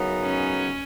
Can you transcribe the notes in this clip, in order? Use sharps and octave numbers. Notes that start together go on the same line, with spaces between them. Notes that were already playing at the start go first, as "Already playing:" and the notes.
Already playing: F#2 C#3 F#3 B3 D#4
C#4